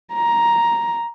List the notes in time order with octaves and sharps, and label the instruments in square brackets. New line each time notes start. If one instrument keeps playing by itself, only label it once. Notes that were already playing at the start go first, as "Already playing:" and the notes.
[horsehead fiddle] A#5